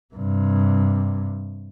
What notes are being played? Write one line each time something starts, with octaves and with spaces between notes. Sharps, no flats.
G2 C3